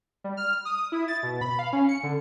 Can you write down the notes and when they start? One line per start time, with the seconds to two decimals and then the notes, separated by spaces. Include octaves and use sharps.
0.24 G3
0.37 F6
0.65 D#6
0.92 E4
1.08 A6
1.23 B2
1.41 B5
1.59 F5
1.73 C#4
1.89 C#7
2.03 D3